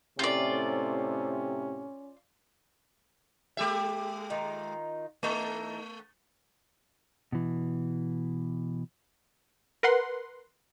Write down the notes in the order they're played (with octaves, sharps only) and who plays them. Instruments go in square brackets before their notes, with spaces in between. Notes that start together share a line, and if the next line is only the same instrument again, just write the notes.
[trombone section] A2 C3 [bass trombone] C#4 [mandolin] F4 D5
[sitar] G#3 G4 E5
[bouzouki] D#3 D#4 F4
[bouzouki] E3 D#4 A4 [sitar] A3
[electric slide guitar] B2 E3
[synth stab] A#4 B4 F#5 C6